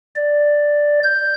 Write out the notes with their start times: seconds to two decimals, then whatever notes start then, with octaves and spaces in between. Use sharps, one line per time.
0.16 D5
1.03 G6